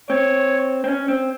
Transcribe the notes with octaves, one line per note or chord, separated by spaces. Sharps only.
C4 C#5
C4
C#4
C4